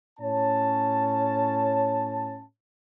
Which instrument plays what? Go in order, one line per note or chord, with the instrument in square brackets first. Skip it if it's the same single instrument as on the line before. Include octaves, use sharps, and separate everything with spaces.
[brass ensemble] A2 C#4 C#5 A5